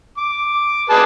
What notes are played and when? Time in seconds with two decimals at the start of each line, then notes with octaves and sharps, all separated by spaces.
0.18 D6
0.90 G#4 B4 A5